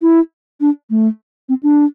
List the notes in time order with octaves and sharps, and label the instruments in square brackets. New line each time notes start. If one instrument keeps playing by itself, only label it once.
[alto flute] E4
D4
A3
C4
D4